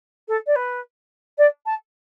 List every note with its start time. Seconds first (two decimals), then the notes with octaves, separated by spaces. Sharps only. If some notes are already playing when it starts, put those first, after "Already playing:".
0.28 A4
0.47 D5
0.56 B4
1.38 D5
1.66 A5